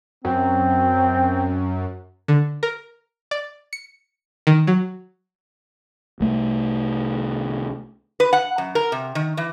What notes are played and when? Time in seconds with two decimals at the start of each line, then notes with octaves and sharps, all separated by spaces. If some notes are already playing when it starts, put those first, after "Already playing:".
0.25 F#2 C4
2.28 D3
2.63 A#4
3.31 D5
3.73 C#7
4.47 D#3
4.67 F#3
6.20 C2 A3
8.20 B4
8.33 F#5
8.58 F#2
8.75 A#4
8.92 C3
9.15 D#3
9.37 E3